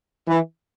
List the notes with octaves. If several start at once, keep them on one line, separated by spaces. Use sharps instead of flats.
E3